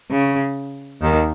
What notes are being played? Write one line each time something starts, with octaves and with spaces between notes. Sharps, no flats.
C#3
D#2 D#3